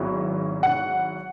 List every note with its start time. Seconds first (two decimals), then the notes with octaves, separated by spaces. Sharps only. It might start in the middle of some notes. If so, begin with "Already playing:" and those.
Already playing: G#1 G#2 F#3 B3 E4
0.63 F#5